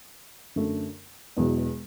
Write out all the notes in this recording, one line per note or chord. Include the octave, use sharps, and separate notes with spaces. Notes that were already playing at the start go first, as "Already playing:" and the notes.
F#2 D3 A3
E1 E2 B2 F#3